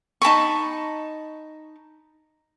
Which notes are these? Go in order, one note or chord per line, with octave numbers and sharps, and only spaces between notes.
D#4 A5 B5 C#6